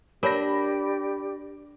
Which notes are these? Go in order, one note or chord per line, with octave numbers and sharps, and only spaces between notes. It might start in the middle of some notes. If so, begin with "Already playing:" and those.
D4 G4 A#4 C#5 D5 B5 A#6